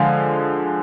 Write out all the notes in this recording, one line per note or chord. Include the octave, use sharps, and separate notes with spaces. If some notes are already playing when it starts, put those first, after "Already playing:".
Already playing: D3 F3 G#3 F5 G#5